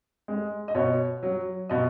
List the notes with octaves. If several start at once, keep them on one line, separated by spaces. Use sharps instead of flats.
G#3
D#5
B2 C#5
F#3
B2 D#5